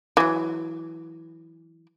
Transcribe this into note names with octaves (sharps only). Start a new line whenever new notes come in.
E3 F#3